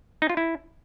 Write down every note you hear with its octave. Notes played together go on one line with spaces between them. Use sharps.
D#4
F4
E4